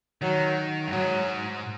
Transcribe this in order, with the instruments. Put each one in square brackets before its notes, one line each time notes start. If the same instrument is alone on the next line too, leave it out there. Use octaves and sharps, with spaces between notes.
[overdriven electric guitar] D#3 [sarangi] F#3
[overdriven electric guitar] F#2
[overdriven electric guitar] G#2 [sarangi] F#3